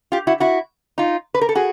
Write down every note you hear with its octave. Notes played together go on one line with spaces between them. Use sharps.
F4 G4
E4 F#4
E4 F#4
D#4 F4
B4
A#4
A4
F#4 G#4